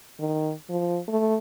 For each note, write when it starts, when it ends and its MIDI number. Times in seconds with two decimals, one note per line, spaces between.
0.20 0.52 51
0.69 1.00 53
1.08 1.37 57